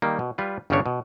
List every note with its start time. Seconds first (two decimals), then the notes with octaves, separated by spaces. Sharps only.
0.02 D#3 G3 A#3
0.19 B2
0.38 G3 F4 B4
0.70 G1 C#3 G3 C#4 D4 C#5
0.86 B2